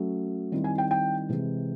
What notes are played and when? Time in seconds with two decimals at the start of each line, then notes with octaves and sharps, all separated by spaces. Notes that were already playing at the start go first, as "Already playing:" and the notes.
Already playing: F#3 A3 C#4
0.52 D#3 G3 C4 E4
0.64 G#5
0.78 G5
0.91 G5
1.29 C3 E3 G#3